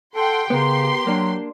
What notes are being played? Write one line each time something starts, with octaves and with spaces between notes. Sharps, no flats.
A4 F#5 G5 C6
C#3 B3 G4 A#4 C6
F#3 A#3 D4